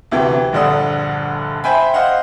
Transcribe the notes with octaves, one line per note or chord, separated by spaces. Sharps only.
D2 C3 E3 G5
A#1 G2 D3 D4 F#5 D#6
C5 E5 G5 G#5 B5
C5 D#5 F5 F#5